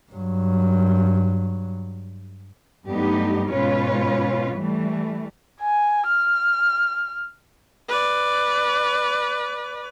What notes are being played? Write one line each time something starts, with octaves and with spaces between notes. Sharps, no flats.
G2 F#3
G2 F#3 A3 B3 D#4 G4
G#2 B2 C#4 F4 B4 C#5
E3 G3 A3
G#5
F6
B4 D5